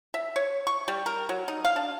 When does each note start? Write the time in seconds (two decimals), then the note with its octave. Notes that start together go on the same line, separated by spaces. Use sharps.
0.14 E5
0.36 C#5
0.67 C#6
0.88 G3
1.06 A#4
1.29 F#3
1.48 D#4
1.65 F5
1.76 D4